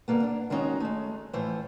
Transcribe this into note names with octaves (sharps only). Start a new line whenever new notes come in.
D3 G3 A#3 B3
D4
D#3 G#3 B3 C#4 D#4 F#4
G#3 A3
A2 E3 F3 C5 C#5